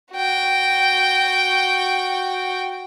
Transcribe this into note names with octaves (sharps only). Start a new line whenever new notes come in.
F#4 G5